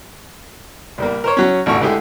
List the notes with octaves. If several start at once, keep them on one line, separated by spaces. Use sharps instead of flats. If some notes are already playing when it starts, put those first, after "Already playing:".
A#1 G3 A#3
A#4 C5 C#5
F#3 C#4
A1 F2 D3 E4 F#4 C#6
D3 G#3 A3 E4 G4 G#4